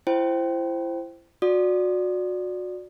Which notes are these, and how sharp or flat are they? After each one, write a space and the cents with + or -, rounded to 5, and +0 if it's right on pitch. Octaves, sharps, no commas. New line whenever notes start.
E4 +35 C5 +0 G5 -15
F#4 -25 D5 +0 D#6 -20